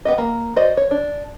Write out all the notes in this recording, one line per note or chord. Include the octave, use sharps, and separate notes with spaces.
B3 G4 D#5
A#3
F#4 C5 D5 D#5
C#5
D4